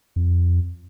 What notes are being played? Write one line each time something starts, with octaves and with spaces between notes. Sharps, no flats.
F2